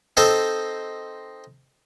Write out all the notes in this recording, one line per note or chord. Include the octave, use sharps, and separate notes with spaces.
C4 D#4 A4 C5